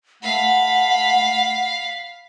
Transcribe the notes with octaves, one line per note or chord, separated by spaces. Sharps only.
A3 F5 F#5 B5